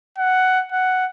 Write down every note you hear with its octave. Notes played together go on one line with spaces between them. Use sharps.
F#5
F#5